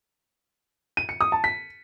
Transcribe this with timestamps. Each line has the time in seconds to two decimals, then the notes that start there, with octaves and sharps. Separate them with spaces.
0.97 D#7
1.09 C#7
1.21 D#6
1.32 A5
1.44 B6